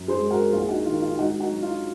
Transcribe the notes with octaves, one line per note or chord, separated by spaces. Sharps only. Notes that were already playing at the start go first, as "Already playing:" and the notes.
Already playing: F#2
G#4 C5
G#3
F#4 A#4
A#1 F4 G#4
D#4 F#4
D#3 F4
F4
G#2 D#4 F#4
D#4 F#4
F#3
F4